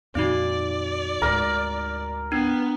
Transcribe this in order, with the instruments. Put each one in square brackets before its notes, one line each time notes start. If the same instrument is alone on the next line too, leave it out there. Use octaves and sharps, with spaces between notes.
[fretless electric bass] F2 A#2 D#3 [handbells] C4 D#4 F#4 [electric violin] D5
[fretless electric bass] D2 G#2 [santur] A#4
[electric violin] B3 [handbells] D4